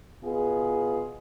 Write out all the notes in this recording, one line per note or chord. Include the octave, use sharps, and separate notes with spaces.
B2 B3 F4 G#4